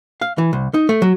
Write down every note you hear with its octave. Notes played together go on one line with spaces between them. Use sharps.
F5
E3
C2
D#4
A3
F#3